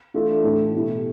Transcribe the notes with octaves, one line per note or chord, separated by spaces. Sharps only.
E3 A3 D4 F4 A4
A2 E3 A3 E4
B2 A3 E4 G4